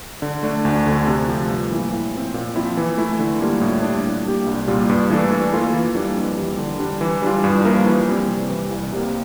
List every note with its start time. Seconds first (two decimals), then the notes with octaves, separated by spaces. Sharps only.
0.22 D3
0.43 A3 D4
0.65 D2
0.86 D3 A3
1.07 C3
1.28 F3 A3
1.50 G2
1.71 E3 A#3 E4
1.92 A2
2.13 F3 C4
2.34 A#2
2.56 F3 C4 E4
2.77 E3
2.97 A3 E4
3.19 D3
3.41 G3 A#3 F4
3.61 A2
3.82 G3 D4
4.04 A#2
4.25 G3 A#3 D4 G4
4.46 C2
4.68 A#2 G3 A#3 F4
4.89 G2
5.10 E3 A3 D4 A4
5.32 E3
5.53 A#3 F4 A4
5.74 E3
5.95 G3 A#3 D4
6.16 F2
6.38 E3 G3
6.58 D3
6.79 G3 D4
7.01 E3
7.22 G3 D4 F4
7.44 G2
7.65 F3 A#3 E4 A#4
7.86 E3
8.08 G3 C4
8.28 C3
8.49 E3 G3
8.71 C2
8.92 C3 G3 A#3